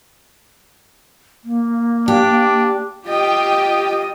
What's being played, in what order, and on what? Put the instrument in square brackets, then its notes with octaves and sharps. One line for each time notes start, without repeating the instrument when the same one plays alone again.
[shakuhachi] A#3
[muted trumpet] D4 [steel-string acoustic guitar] G4
[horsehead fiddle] F4 D#5 [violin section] G4 G5